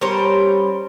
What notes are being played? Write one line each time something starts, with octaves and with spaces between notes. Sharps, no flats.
G3 C#4 A#4 C5